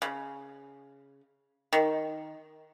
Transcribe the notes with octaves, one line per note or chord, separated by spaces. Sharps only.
C#3
D#3